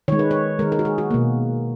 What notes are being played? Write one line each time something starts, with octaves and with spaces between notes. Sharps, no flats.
D#3 G#3 C#5
B4
C#5
D#3 G#3 A#4
A#4
F#4
G#4
F#4
B2 A#3